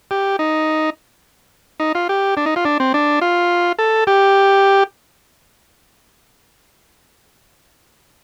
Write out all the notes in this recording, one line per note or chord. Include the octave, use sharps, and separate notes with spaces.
G4
D#4
D#4
F4
G4
D4
D#4
F4
D4
C4
D4
F4
A4
G4